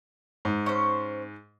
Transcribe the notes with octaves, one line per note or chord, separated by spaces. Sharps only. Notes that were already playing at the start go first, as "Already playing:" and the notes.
G#2
C#4 C5